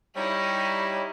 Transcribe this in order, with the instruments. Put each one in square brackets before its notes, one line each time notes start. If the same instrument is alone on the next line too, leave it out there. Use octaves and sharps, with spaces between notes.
[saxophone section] G3 C#5 [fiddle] D#4 E4